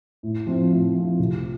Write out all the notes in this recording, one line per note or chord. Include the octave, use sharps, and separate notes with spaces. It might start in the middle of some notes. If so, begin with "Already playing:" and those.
A2
F3 C4 F4
A2
F3 C4 F4
C2